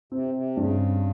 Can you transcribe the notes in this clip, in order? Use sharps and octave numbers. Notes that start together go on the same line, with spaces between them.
C3 C4
C3
G2 C#3